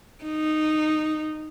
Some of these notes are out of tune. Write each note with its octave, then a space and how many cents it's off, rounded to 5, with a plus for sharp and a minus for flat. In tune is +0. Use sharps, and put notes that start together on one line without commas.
D#4 -10